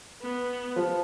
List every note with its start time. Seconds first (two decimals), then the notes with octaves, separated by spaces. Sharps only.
0.22 B3
0.76 F3